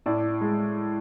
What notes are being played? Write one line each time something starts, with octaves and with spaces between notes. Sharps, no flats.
A2 D5
G#3